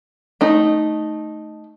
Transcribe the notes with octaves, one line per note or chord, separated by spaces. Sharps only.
A3 D#4